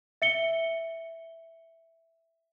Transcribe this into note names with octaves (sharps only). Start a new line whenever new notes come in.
E5 C#7 G7